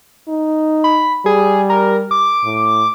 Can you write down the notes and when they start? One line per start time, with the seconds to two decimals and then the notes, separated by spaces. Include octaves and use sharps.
0.29 D#4
0.84 B5
1.26 G3 G#4
1.70 A#4
2.11 D6
2.44 A2